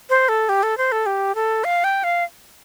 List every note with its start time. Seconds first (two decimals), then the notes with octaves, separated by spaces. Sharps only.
0.10 C5
0.29 A4
0.49 G4
0.63 A4
0.78 C5
0.92 A4
1.06 G4
1.35 A4
1.64 F5
1.84 G5
2.04 F5